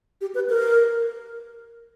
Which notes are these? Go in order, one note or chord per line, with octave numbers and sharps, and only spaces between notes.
G4
B4
A#4